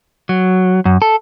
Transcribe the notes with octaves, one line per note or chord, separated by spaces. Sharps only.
F#3
F#2
A4